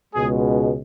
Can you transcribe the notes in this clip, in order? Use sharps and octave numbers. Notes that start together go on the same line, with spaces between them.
C#2 B2 G#3 G#4